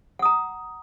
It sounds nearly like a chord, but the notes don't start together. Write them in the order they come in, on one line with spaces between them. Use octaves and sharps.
F#5 D#6 A#5